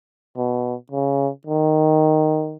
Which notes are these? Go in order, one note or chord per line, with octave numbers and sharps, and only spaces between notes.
B2
C#3
D#3